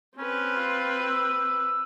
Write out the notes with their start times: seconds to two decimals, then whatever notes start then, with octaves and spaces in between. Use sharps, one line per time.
0.18 C4 C#4 B4
0.56 F4
1.04 E6